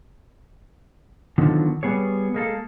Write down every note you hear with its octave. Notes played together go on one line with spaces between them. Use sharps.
D3 D#3 F3 F#3 B3
G3 B3 G#4 C#5
G#3 A#3 A4